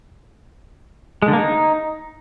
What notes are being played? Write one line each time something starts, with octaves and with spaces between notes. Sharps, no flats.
G#3
D3
A#3
D#4